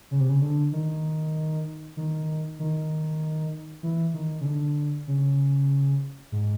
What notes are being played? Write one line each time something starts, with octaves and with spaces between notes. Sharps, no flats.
C#3
C3
C#3
D3
D#3
D#3
D#3
E3
D#3
C#3
D3
C#3
G#2